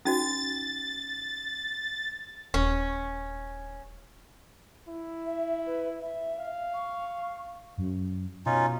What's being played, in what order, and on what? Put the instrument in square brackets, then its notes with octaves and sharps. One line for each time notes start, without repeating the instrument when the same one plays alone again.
[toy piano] C#4 D#4 F#4 [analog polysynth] A6
[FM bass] D#1 [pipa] C#4
[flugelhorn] E4
[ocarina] E5
B4
E5
[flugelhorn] F5
[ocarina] C#6
[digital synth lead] F#2
[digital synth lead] B2 [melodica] C#4 D#4 F4